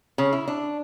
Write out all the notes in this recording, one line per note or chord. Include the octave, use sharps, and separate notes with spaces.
C#3
E4
D4